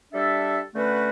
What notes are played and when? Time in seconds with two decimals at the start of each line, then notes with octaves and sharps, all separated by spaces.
0.13 G3 D4 A4 E5
0.73 D3 A3 C#4 F#4 B4